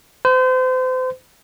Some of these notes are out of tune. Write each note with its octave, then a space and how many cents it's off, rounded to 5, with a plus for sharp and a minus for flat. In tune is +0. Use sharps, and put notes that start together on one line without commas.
C5 -35